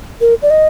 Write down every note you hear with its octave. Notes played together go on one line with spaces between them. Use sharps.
A#4
D5
D#5